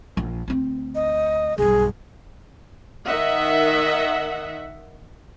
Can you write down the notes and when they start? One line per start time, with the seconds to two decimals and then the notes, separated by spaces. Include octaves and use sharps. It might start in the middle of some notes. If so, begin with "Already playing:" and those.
0.17 A#1
0.48 D2 C4
0.95 D#5
1.58 B1 G2 G#4
3.05 D#3 D#5 E5 F#5